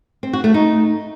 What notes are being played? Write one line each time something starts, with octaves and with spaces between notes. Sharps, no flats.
C4
F#4
A3
D#4